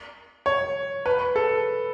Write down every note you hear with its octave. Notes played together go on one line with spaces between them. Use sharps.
C#5
B4
A4